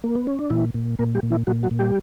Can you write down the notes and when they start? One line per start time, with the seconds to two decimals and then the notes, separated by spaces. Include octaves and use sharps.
0.04 A#3
0.15 B3
0.27 C#4
0.39 D4
0.50 A#2 E3 E4
0.74 A#2
0.99 A#2 A#3 A#4
1.15 G3 G4
1.23 A#2
1.30 E3 E4
1.47 A#2 F#3 F#4
1.63 F#3 F#4
1.71 A#2
1.79 G3 G4